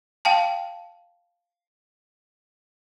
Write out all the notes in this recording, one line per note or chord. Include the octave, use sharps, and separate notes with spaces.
F5 G5 A5